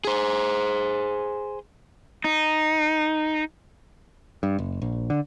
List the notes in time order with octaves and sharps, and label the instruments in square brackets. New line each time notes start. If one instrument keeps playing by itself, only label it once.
[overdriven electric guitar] G#4 C5
[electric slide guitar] D#4
[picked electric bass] G2
F#1
A#1
D3